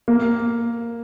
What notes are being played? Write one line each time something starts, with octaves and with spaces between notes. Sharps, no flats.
A#3